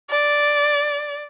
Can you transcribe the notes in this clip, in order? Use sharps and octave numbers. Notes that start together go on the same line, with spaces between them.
D5